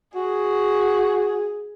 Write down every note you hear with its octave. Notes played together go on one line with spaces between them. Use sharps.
F#4 G#4